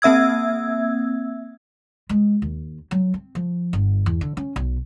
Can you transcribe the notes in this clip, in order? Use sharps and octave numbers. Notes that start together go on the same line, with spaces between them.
A#3 C4 E5 E6 G#6
G#3
D#2
F#3
C4
F3
G1
E2
D3
C#4
B1